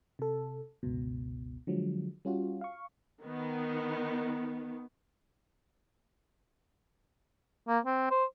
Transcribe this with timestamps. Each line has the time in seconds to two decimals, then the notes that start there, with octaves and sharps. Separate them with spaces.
0.19 C3 A4
0.83 G1 C#2 B2
1.67 D3 F3 F#3 G#3
2.25 G3 C#4 F4 F#4
2.61 F5 C#6
3.23 D#3 B3
7.68 A#3
7.85 C4
8.11 C5